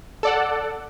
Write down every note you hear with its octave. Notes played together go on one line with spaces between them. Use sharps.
A4 D5 F#5